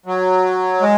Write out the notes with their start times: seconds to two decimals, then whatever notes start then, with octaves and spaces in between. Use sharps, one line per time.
0.06 F#3
0.81 G#3